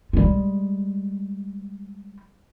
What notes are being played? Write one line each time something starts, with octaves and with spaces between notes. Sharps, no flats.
G3 G#3